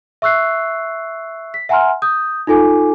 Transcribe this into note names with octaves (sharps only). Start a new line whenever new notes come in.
E5 C#6 E6 F#6 C7
B6
E5 F#5 G#5 A#5 C6 F6
D#6 G6
D#4 F4 A4 G#5 D6